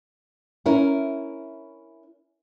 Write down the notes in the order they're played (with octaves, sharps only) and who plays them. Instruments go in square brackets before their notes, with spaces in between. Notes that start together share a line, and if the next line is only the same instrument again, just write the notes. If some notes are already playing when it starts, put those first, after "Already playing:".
[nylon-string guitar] C#4 E4 A#4